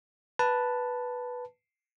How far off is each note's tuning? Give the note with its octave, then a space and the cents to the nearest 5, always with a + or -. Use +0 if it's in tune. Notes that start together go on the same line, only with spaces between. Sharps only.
B4 -5 A5 +5